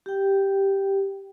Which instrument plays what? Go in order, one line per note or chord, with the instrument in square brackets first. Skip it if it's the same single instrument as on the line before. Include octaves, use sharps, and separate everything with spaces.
[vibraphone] G4 G5